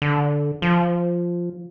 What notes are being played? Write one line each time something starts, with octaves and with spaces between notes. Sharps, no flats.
D3
F3